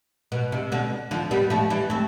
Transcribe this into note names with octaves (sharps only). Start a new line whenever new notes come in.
B2
C3
B2 D3
D3 F3
G3 B3
F3 A3
E3 G3
A3 C4